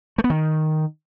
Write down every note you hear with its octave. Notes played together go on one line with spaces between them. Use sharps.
A3
B3
D#3